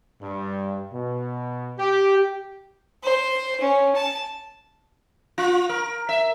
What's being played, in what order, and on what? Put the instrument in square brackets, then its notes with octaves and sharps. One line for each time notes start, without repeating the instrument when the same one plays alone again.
[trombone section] G2
B2
G4
[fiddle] C5
C#4
A5
[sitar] F4
A#4
E5